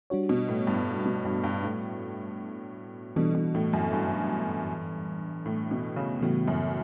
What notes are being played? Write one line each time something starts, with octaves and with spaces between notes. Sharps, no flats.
G3 D4 F#4 C#5
B2
A2
G2
B2
G2
G2
A2
B2 E3 G3 D4 A4
B2
A2
F#2
G2
A2
B2
C#3
A2 C#3 E3 G3 B3 F#4
F#2